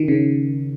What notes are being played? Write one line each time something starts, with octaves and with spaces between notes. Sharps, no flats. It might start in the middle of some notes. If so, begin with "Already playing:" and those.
Already playing: D#3
C#3